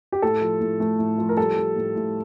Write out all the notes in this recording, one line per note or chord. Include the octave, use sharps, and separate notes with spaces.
G4
A2 A4
F3
A2
A3
A2
F3
A#4
G3 A4
G3
A2
A2